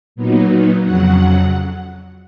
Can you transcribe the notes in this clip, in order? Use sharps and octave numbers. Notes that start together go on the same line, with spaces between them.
A#2 F#3 B3 D#4
F2 C#3 F#3 F#5